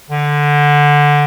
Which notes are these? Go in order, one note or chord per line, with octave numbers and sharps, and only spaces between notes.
D3